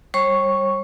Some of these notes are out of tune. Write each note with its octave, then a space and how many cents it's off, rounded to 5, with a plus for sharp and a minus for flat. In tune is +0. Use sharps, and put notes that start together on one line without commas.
G3 +0 C#5 -40 C#6 +0